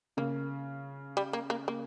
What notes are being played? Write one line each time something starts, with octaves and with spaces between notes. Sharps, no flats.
C#3 A#3
G3
A#3
A#3
A#3